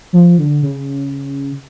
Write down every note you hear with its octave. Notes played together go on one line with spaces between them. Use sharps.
F3
D3
C#3